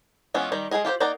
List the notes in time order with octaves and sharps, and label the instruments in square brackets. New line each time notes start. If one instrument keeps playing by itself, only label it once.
[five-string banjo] E3 G#3 B3 C#4 F4
D#3 G3 A#5
G#3 A#3 F4 G#4 D#5
F4 G4 G#4 C5
A#3 D#4 D5 F#5 A#5